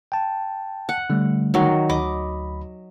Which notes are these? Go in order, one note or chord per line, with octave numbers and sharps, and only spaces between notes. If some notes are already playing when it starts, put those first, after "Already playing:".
G5 A5
F#5
D3 G3 A3
D#3 F#3
D2 D#5 B5 D6